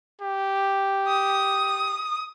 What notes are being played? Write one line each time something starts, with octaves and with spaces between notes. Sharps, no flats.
G4
D#6